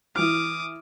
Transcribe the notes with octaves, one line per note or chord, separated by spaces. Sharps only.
E3 D6 D#6 F6